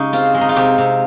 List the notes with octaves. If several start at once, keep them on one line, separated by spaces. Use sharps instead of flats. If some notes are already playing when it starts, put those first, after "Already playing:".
Already playing: C#3 G#3 D#4 G4
C4 F4
G#3
D#4
F4
C3 G4
C3